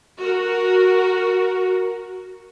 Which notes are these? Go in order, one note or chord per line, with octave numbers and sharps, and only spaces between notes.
F#4 A#4